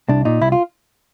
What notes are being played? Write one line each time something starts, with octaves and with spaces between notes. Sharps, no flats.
C2 D4
A#2 D#4
C2 E4
F4